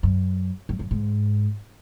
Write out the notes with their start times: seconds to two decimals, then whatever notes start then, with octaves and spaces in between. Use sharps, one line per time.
0.03 F#2
0.69 F#2
0.79 F#2
0.91 G#2